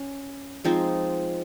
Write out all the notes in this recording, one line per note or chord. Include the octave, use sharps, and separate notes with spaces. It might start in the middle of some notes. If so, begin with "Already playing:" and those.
Already playing: C#4
F3 G#3 C4 D#4